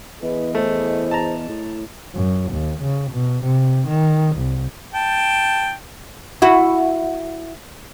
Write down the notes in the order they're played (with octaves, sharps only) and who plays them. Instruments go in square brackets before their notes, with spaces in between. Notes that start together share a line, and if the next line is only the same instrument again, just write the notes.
[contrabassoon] E2 [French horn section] E4 G#4 D#5 [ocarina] B4
[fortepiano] A3 [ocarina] C5
[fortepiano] A5 A#5
[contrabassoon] A2
[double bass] F#2
D#2
C#3
B2
C3
D#3
C2
[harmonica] G5 A5
[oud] E4 F#4